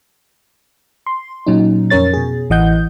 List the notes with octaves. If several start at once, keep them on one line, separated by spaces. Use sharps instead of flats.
C6
A#2 F#3 C#4 D#4
F2 C#4 A#4 C#5 A6
B2 G#4
A1 E3 D#5 F#5 G6